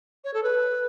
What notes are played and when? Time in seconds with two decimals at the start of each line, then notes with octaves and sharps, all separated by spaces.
0.24 C#5
0.34 A4
0.43 B4